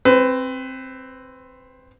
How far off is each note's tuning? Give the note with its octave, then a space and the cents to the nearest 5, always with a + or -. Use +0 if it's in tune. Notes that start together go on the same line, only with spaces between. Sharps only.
C4 +10 B4 +30